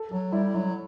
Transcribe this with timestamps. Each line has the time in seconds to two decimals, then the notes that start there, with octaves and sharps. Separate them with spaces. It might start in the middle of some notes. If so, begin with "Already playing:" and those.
Already playing: A4
0.11 F#3 A4
0.32 G3 E4
0.54 F#3 E4